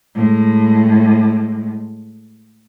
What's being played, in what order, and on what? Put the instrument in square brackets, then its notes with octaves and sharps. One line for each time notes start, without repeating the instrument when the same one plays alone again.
[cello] A2 G#3